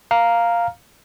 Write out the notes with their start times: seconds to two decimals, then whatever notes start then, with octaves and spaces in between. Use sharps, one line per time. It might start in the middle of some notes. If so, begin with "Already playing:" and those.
0.11 F5 A#5 F6